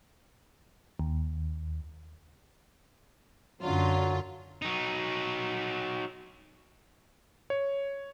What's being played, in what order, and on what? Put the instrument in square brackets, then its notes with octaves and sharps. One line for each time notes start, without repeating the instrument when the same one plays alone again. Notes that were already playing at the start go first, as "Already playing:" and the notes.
[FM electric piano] D#2
[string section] F#2 D3 F4 [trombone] F#3
[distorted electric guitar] F#3 D#4
[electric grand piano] C#5